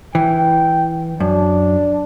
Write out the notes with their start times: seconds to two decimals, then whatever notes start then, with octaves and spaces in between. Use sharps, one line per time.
0.15 E3 G5
1.20 F#2 D4